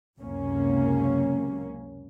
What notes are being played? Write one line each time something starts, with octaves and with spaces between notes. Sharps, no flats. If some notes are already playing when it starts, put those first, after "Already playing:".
F#1 C#2 F#2 C3 A#3 C#4